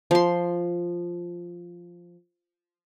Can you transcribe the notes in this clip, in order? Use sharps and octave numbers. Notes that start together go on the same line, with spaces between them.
F3 C6